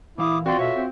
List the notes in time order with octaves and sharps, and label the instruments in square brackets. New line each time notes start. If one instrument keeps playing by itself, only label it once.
[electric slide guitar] A#2 E3 F5 [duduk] E4 [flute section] D6 D#6
[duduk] C4 [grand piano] F4 F#4 [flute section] D5 G5 C6
[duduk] B2 [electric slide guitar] A4 C#5 [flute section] E5
[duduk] C4